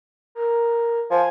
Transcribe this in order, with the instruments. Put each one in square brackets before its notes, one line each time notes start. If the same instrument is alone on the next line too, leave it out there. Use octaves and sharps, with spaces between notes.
[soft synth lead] A#4
[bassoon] F3 [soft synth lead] G#5